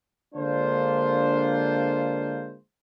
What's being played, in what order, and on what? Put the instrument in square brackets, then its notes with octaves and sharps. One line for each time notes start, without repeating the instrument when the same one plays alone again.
[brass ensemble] D3 G#3 A#3 D4 F4 C5